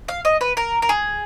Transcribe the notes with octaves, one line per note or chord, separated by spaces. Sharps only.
F5
D#5
B4
A#4
A#4
G#4